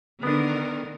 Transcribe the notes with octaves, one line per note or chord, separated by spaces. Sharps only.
D3 D#3 B3 D4 A#4